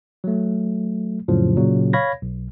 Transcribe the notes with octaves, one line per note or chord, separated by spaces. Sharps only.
F#3 A3
F2 A2 C#3 F3 F#3
A#2 C#3 F#3
C#5 F5 B5 G#6 A#6
B1